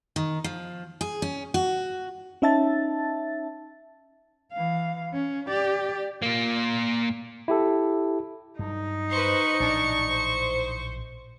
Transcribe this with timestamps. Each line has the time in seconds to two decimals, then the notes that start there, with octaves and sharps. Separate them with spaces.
0.16 D#3
0.44 F3
1.01 G#4
1.22 C#4
1.54 F#4
2.42 C#4 D#4 E5 A5 A6
4.52 E3 F5
5.13 C#4
5.48 G4 D5
6.22 A#2 A#3
7.48 E4 G4 A4
8.59 G2 F#3 D#4
9.11 B4 C5 C#6
9.60 A#1 A2 E3 D4
10.09 C5